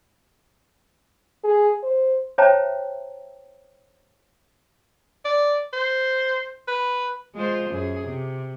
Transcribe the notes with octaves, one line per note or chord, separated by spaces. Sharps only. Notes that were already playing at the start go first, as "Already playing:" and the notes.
G#4
C5
C5 C#5 E5 G5 A5 A#5
D5
C5
B4
G#3 F4 C5
F#2 G#4
C3